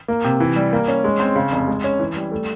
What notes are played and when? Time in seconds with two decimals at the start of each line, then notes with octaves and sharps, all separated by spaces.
0.08 A#3
0.24 C3
0.40 E3
0.56 G3
0.73 A#3
0.88 C#4
1.04 G#3
1.20 C4
1.36 C#3
1.52 F1
1.68 G#3
1.84 C#4
1.99 E3
2.16 G3
2.32 A3